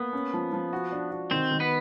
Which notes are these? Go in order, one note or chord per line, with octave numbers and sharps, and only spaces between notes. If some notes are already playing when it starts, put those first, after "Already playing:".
Already playing: A#3 B3
C#4
F3
F3
F#4
D4
F#4
D#3 C4 C5
D#3
B3 B4